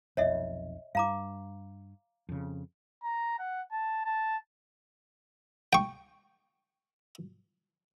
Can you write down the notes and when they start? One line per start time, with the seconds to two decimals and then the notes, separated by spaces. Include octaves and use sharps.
0.17 F1 B1 F2 C#5 D#5 E5
0.95 G2 F5 A#5 D6
2.29 F2 C#3
3.03 A#5
3.39 F#5
3.72 A5
4.05 A5
5.73 G5 C#6